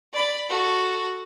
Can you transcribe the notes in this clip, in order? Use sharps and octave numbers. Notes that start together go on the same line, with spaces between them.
D5 B5
F#4 A4